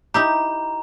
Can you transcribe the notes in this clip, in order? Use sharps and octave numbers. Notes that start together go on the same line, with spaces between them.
D#4 E4 G4 A#5